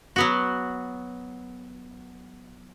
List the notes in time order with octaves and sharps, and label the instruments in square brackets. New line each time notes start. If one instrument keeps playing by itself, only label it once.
[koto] F#3 B3 F#4